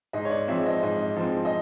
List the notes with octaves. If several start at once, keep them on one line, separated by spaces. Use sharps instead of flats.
G#2 D#5
C#5
D5
F3 G#3 C4 E5
D#5
G#2 D#5
F3 G#3 C4
D#5